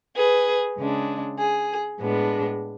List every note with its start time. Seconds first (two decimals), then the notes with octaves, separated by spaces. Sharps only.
0.16 G#4 B4
0.78 C#3 G#3 D4
1.38 G#4
2.00 A2 G#3 B3 D4